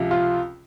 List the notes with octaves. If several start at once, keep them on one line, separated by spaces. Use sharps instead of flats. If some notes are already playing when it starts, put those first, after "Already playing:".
Already playing: C#2 C3 F3
F4